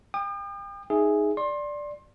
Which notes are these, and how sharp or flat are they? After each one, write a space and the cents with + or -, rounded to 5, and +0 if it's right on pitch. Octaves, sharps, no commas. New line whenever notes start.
G5 +30 D#6 -45
D#4 +0 G#4 +0 E5 +0
D5 +0 C6 +25